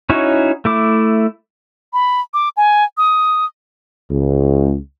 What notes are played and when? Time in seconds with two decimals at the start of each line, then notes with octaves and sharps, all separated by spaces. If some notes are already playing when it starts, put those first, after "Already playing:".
0.10 C#4 D#4 E4 F#4 C#5
0.65 A3 E4 D6
1.93 B5
2.34 D6
2.57 G#5
2.98 D#6
4.10 C#2